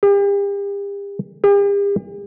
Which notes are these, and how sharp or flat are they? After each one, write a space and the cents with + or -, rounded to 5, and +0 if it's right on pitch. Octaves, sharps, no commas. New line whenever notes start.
G4 +40
G4 +45